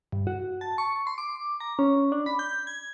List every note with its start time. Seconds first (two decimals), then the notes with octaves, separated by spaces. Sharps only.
0.12 G2
0.27 F#4
0.61 A5
0.78 C#6
1.07 C6
1.18 D6
1.60 A#5
1.79 C#4
2.12 D4
2.26 B5
2.39 G6
2.67 G#6